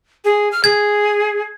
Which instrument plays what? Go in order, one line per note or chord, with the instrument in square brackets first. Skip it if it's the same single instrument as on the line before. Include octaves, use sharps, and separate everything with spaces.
[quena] G#4
F6
[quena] G#4 [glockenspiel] G#6